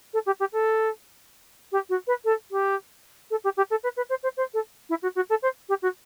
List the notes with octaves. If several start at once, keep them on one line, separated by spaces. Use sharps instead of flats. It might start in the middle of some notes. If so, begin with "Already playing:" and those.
A4
G4
G4
A4
G4
F#4
B4
A4
G4
A4
G4
G4
A4
B4
B4
C5
C5
C5
A4
E4
F#4
F#4
A4
C5
G4
F#4